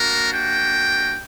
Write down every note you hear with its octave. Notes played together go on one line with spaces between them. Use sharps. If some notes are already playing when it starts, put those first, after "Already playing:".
Already playing: A#3 D4 F#4 A#4
G5